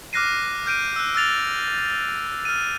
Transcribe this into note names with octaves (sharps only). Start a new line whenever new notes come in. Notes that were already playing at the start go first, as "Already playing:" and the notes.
D6 F6 F#6 A#6 C7 D#7
F6 G6 D7 D#7
E6 F#6
E6 F6 A6 F7
F6 D#7